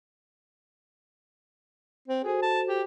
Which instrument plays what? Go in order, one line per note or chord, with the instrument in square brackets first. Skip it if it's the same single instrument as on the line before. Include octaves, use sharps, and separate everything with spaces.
[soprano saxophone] C4
[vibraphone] F#4 A4 C5 [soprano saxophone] G#4
[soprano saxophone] A5
G4